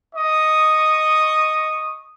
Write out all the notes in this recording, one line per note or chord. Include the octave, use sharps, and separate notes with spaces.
D#5 C#6 D#6